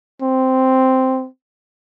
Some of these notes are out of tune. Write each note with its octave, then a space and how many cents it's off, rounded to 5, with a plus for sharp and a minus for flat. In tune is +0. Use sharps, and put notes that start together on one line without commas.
C4 -5